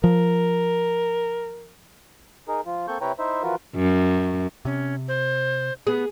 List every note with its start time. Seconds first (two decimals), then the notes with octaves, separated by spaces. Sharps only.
0.04 F3 A#4
2.48 D#4 G#4 A#4
2.66 F3 F4
2.88 A#3 C4 A4 C#6 G6
3.01 C3 E4 B4 C#5 G5 A#5
3.19 D#4 E4 C5 E5
3.43 E3 F3 F4 F#4 A#4 B4
3.76 F#2
4.65 C3 C#4
5.08 C5
5.87 B3 G#4